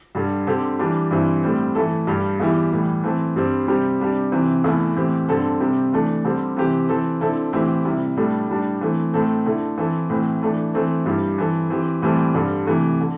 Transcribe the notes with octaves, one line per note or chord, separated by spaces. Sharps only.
G2 D3 G3
D3 C4 G4
E3 G3 D4 G4
G2 E3 C4 E4
A2 G3 C4
E3 A3 E4 A4
G2 G3 D4 G4
E2 E3 G3 E4 G4
A2 E3 G3
E3 A3 C4 A4
G2 G3 C4
C3 G3 C4 G4
C3 G3 D4 G4
C3 E3 C4
E2 E3 A3 E4
A2 E3 C4 G4
G2 D3 C4 A4
C3 G3 C4 G4
E3 A3 D4
D3 G3 C4 G4
C3 E3 C4 G4
E3 C4 A4
D3 C4 E4 A4
A2 E3 C4 E4 G4
C3 G3 E4
A2 G3 D4 A4
A2 G3 D4
E3 A3 C4
A2 A3 C4 A4
D3 A3 E4
E3 C4 E4 A4
A2 E3 C4
E3 A3 D4
E3 A3 C4 A4
G2 G3 E4 G4
E3 C4 A4
E3 C4 G4
A2 E3 G3 C4 A4
G2 D3 G3
C3 E3 A3
D3